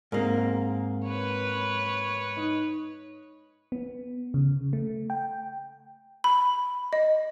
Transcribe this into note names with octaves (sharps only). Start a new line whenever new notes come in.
G#2 A#3 C4 A#4
B4 C#5
D#4
B3
C#3
A3
G5
B5
D#5